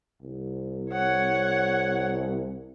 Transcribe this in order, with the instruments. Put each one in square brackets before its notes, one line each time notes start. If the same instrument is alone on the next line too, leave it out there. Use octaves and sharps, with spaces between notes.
[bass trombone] C2
[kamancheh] C#5 F#5